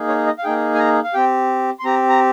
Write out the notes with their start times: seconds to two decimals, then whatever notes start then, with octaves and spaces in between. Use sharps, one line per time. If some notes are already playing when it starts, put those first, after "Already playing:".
Already playing: A#3 D#4 G#4
0.08 C#5
0.26 D#5
0.38 F5
0.43 A#3 D#4 G#4 G5
0.75 G#5
0.79 A#5
1.04 F5
1.14 C4 G4 G5
1.79 C6
1.84 C4 G4 A#5
2.09 A#5